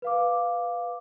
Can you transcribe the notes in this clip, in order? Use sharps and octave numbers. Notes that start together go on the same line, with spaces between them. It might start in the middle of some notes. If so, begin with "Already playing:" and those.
B4 F5 D6